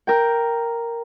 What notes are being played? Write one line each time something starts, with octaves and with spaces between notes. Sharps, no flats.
A#4 G5